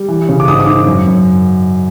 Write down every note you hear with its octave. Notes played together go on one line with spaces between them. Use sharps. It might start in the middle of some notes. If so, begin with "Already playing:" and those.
Already playing: G3
E3
C#3
D6
G#2 D#6
D#6
D#3 D6
F#2
F#2